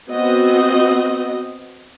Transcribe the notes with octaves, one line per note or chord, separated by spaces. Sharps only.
B3 C4 F#4 D#5